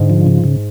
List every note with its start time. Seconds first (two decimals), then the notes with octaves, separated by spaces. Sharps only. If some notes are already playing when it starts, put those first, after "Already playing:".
Already playing: G#2 D3
0.10 F3
0.27 C#3
0.44 C#3